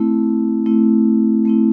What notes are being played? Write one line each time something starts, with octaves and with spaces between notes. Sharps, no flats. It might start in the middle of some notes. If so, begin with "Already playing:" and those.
Already playing: A3 C4 E4
A3 C4 E4
A3 C4 E4